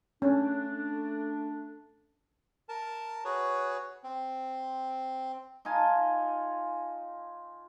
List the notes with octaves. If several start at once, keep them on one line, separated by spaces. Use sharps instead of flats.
A3 C#4 D4
A#4 A5
F#4 G#4 B4 C#5
C4
D#4 F4 G#5 A5